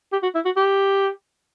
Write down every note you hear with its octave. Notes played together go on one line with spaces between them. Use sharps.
G4
F#4
E4
F#4
G4